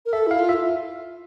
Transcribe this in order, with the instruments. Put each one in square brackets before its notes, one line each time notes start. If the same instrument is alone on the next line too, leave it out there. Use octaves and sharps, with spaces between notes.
[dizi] A#4
[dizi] A4 [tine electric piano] E5
[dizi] E4 [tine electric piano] F5
[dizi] F4
[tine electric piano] E5